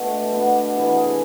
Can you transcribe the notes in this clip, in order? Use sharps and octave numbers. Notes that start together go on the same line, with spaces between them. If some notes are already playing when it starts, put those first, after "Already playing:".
Already playing: B2 A3 D4 A4 B4 D5
B2 B3 D4
C3 E3 B3 B4
G#4